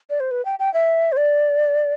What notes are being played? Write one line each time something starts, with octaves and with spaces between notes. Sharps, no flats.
D5
C5
B4
G5
G5
E5
C5
D5